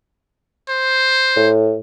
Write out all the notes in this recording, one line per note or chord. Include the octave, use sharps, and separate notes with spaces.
C5
A2